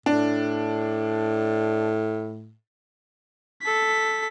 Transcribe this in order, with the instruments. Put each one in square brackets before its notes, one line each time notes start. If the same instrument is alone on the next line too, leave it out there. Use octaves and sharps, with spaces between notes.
[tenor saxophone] A2 [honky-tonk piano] D4
[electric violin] A4 B6